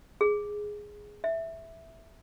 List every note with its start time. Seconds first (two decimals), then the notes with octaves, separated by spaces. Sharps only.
0.21 G#4
1.24 E5